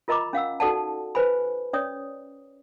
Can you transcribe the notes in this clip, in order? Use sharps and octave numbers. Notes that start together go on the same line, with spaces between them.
F4 A#4 D#5 A#5 B5 D6
C#4 F5 F#5 E6
D#4 F#4 A4 D5 F#5 A5
B4 C5 G#5 B5
C#4 C#5 D5 D#6